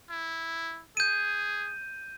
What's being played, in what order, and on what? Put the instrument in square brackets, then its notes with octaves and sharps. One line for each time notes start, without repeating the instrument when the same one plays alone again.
[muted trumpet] E4
[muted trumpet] G#4 [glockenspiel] G6 D#7